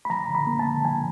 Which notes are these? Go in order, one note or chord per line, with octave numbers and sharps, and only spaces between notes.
B5
F3 A#5
D3
B5
A#3
A5
D3
F3 G#5